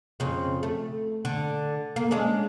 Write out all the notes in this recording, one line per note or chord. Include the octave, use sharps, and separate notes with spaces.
F2 C#3
A3
D3
A#3
G#3 C#4 D4